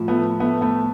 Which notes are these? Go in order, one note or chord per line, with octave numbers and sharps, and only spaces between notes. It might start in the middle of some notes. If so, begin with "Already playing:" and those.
Already playing: A2 F3
A3 B3
A3 B3
A3 B3